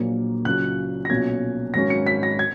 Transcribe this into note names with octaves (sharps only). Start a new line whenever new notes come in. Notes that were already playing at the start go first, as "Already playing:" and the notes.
Already playing: A#1 A#2 F#3 A#3
C#2 C#3 F#3 F#6
A#6
B1 A#2 F#3 C#4 G#6
G#1 G#2 F#3 C#4 A#6
C#7
B6
A#6
G#6